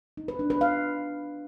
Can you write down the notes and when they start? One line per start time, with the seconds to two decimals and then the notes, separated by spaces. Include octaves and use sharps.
0.17 D#4
0.28 B4
0.39 D4
0.50 B4
0.61 F5